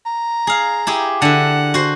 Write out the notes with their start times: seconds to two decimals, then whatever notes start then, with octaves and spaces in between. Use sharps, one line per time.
0.06 A#5
0.47 G#4 F5
0.87 E4 G4 G#4
1.22 D3 E5 F#5
1.74 F#4 C5